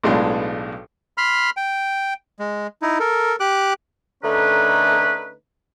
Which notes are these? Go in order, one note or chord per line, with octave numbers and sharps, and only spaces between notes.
B1 A2 G#3 B3 D4 F4
B5 C6 F6
G5
G#3
D#4 E4
A4 A#4
G4 D6 F#6
D3 A3 C#4 D#4 A#4 B4